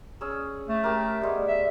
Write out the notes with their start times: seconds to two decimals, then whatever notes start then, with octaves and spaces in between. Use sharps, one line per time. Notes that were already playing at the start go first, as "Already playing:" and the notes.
0.21 C#4 G#4 E6
0.69 A3
0.83 G4 A#4
1.22 G3 G#3 B3
1.48 E5